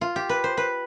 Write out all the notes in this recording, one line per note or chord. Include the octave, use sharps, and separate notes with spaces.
F4
G4
B4
C5
B4